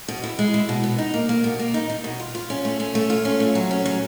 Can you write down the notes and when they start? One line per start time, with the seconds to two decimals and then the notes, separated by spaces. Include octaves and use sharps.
0.08 B2
0.24 E4
0.39 G#3
0.54 E4
0.69 B2
0.84 B3
0.98 D#4
1.14 A#3
1.29 A#3
1.44 B2
1.59 A#3
1.74 D#4
1.90 D#4
2.04 B2
2.20 F4
2.35 F4
2.50 C#4
2.65 A3
2.80 C#4
2.95 A3
3.10 F4
3.25 C#4
3.40 A3
3.55 F#3
3.71 C#4
3.86 F#3